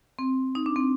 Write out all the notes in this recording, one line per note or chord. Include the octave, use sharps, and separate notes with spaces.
C4
D#4
D4
C4